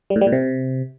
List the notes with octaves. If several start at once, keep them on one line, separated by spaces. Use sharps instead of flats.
G3
A2
G3
A#2
C3